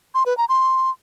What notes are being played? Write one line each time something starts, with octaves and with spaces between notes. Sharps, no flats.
C6
B4
A#5
C6